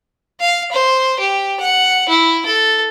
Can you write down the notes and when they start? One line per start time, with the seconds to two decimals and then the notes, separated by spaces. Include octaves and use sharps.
0.40 F5
0.72 C5
1.19 G4
1.60 F#5
2.09 E4
2.46 A4